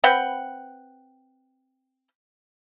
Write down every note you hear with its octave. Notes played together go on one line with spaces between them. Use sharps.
C4 B4 F#5 G5